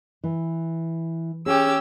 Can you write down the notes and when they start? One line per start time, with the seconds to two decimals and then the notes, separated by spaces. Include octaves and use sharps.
0.24 E3
1.46 C#4 G4 G#4 E6